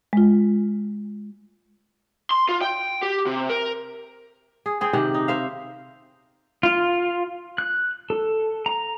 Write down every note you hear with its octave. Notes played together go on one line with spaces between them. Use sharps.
G#3 F4
C6
F4
G5
G4
C3
A#4
G#4
C4 G#4 G5
C3 D#3 G4 F#5
D#4
C5 E5 F5
F4
F#6
A4
A#5